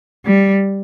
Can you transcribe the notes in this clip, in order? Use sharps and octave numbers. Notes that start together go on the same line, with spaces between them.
G3